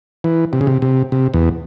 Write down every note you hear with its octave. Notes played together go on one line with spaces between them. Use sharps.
E3
C3
C#3
C3
C3
C3
E2